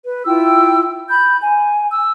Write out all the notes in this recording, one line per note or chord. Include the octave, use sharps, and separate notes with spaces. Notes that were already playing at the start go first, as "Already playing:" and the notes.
B4
E4 F4 G5 E6
B5 G6
G#5
E6